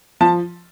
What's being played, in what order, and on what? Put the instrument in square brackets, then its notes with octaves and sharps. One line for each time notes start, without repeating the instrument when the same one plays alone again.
[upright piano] F3 A5